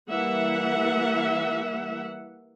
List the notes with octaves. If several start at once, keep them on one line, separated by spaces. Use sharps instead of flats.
E3 G3 A#3 E5 F#5